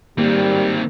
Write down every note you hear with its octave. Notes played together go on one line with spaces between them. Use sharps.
D#3 G3 A#3 C4